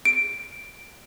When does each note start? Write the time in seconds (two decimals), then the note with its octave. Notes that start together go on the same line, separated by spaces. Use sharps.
0.05 D7